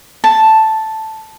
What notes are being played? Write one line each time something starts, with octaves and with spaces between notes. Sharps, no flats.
A5